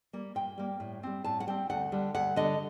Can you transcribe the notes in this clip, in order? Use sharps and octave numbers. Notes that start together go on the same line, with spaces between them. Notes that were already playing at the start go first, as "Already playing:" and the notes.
G3 A#3
A#2 G5
G3 A#3
A2
G3 C4
A2 A5
F#5
G3 C4 G5
D2 F#5
D3 G3
D2 F#5
D3 G3 D#5